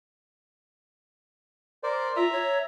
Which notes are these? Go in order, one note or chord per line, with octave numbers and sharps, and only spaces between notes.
A#4 C5 D5
F4 E5 A#5
C#5